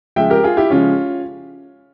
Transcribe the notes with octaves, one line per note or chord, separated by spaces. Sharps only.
C#3 F3 G#3 E5 G5
G4 A#4
F4 G#4
E4 G4
C#3 F3 G#3 C#4 F4